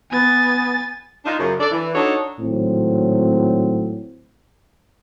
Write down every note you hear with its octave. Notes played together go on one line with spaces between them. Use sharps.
B3 G#5 A6
D4 D#4 F4
F#2 C#3
D4 A4 D5
E3
D4 D#4 F#4 A4 C#5 D#5
G#1 A2 F#3 C4